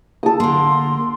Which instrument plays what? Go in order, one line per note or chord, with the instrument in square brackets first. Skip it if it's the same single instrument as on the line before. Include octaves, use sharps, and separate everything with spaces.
[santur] A4 D#6
[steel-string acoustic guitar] D3 A#3 [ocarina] C6